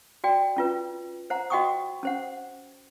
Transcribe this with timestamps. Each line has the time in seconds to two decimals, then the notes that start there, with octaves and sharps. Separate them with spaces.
0.24 F#4 D5 G5
0.56 C#4 F4 B4
1.30 C5 F#5 A#5
1.50 F#4 D#5 F#5 G5 C#6 D#6
2.03 C#4 C5 F#5